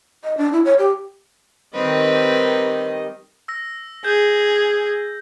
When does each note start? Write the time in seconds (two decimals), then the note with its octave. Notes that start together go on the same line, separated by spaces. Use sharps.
0.24 D#5
0.37 D4
0.52 E4
0.65 C#5
0.79 G4
1.74 D#3 G3 C4 B4 D#5
3.48 E6 A#6
4.04 G#4 G6